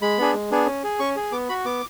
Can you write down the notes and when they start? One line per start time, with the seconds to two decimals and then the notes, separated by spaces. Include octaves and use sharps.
0.02 G#3 B5
0.18 B3 D4 G#4
0.34 G#3
0.51 B3 D4 G#4
0.66 C#4
0.84 G#4
1.00 C#4 C#6
1.16 G#4
1.32 B3 D6
1.49 F#4 B5
1.65 B3 D6